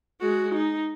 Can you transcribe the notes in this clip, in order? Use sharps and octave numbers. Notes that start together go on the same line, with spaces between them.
G#3 F#4
D#4